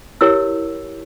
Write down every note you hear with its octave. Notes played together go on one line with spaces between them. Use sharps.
E4 G4 A#4 C#5 E6